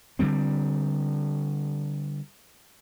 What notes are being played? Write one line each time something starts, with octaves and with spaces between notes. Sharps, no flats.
D3 F3 G3 C4